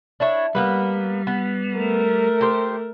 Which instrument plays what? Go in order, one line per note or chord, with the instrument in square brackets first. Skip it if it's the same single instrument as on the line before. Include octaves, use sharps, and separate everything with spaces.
[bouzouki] D4 E4 C#5
[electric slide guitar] G3 [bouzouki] A#3 B3 B4
[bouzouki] B3
[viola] A3 A#4
[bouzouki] G4 C5